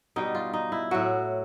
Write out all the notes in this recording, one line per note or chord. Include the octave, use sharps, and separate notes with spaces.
B2 G3 D#4
F4
D#4
E4
A2 F#3 F#4